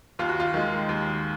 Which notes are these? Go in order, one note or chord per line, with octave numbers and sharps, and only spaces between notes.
D#2 F4
F#4
F4
D#3 G#3
D#2